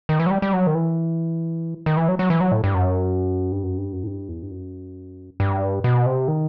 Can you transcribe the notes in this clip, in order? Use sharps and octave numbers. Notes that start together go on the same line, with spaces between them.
D#3
E3
F#3
G3
G3
F#3
D#3
E3
D#3
E3
F#3
F#3
E3
F#3
A2
G2
F#2
G2
F#2
G2
F#2
A2
G2
E2
G2
F#2
G2
B2
C3
D#3